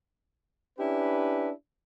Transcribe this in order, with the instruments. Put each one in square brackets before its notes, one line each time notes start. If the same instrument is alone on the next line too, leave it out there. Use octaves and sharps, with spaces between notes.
[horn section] C#4 D4 E4 G4 B4